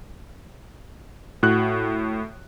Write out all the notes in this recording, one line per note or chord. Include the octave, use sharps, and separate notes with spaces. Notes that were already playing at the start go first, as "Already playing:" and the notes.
A2 F#4 F#6